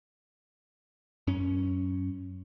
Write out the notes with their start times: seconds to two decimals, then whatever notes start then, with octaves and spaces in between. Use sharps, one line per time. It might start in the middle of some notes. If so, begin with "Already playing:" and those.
1.27 F#2 C#4